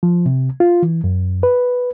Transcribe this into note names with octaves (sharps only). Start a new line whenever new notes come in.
F3
C3
F4
E3
F#2
B4